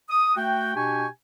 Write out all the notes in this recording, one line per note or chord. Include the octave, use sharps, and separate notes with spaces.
D#6
A3 F#4 G5
B2 D4 G4 G5 G#5 C#6